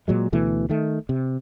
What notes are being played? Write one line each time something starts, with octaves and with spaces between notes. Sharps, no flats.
A#2 F#3 G#3
D2 B2 E3 A3
D#3 A3
C3